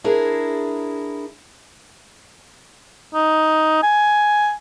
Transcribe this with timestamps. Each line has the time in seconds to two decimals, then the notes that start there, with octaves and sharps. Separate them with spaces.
0.04 D4 E4 G#4 A#4
3.14 D#4
3.83 G#5